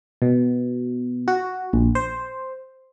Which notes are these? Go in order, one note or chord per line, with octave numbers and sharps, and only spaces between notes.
B2
F#4
A#1
C5